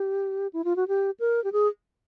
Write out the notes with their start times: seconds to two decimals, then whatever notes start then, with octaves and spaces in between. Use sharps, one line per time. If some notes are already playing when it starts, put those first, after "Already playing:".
Already playing: G4
0.53 E4
0.64 F4
0.76 F#4
0.88 G4
1.20 A#4
1.44 G4
1.53 G#4